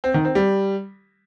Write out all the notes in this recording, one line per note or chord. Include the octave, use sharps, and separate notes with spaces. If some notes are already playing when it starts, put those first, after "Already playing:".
C4
D#3
C4
G3